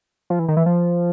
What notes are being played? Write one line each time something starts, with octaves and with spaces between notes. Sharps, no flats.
F3
E3
D#3
E3
F3